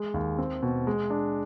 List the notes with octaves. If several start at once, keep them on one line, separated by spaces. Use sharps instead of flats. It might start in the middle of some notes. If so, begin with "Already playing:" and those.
Already playing: G#3
D#2
C4
B2
G#3
D4